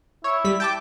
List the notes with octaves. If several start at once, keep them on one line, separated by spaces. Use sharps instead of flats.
E4 C#5
G3 B6
G5 A5 D6